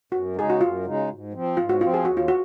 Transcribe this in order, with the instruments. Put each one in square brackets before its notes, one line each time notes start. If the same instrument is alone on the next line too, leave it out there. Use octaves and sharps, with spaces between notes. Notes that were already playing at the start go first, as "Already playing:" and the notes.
[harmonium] F#2 [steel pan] F#4
[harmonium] C#3 G#3 D#4 [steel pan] G#4
[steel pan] F#4
[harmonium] F#2 [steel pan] F4
[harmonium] C#3 G#3 D#4
G#2
F3 C4
[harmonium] G#2 [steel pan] F4
[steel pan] F#4
[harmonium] F3 C4 [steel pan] F4
[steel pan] G#4
[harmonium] D#2 [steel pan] F#4
[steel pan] F4
F#4